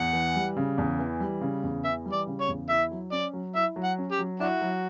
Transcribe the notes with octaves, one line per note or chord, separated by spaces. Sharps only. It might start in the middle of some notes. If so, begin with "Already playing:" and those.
Already playing: E2 F#5
E3
G3
C#3
E2
E3
G3
C#3
E2
E3 E5
G3
D5
C#3
C#5
E2
E4 E5
F#3
C#4 D5
F#3
E4 E5
F#3
F#5
C#4
G4
F#3
D4 E4 F#4
F#3